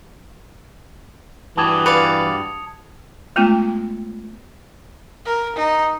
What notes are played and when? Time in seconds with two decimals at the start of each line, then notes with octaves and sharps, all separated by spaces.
1.57 G2 E3 F#4 G4 A5 D#6 G#6
1.86 B4 D5 F5 C#7 F7
3.36 G#3 A3 B3 C#4 F4
5.25 A#4
5.56 D#4